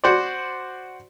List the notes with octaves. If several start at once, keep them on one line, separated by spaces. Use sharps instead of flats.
F#4 C5 D5